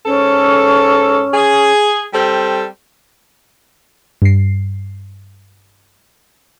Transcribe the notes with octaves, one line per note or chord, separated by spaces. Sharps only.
G#2 C#4 A4
G#4
G3 C4 A4
G2 C7